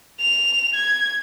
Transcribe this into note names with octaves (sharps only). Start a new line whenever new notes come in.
F7
G#6